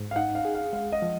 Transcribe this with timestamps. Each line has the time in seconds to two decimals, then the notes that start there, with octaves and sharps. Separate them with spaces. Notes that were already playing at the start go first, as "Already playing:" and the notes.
Already playing: G#2
0.11 F5
0.16 D#4 F#5
0.35 F5
0.45 G#4
0.54 F5
0.73 G#3 F5
0.92 D#5
1.02 F3